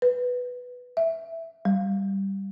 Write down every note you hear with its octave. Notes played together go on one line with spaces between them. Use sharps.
B4
E5
G3